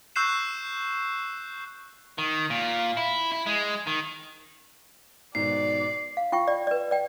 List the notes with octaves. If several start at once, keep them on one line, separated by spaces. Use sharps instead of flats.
C#6 E6 F#6 G6 C7 E7
D#3
A#2
E4
E4
G#3
D#3
G#2 B2 D#3 D5 C7
F5
F4 G5 C#6
D5
B4 D5
D5 G5